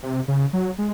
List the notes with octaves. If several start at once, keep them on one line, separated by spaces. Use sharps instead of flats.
C3
C#3
F#3
G#3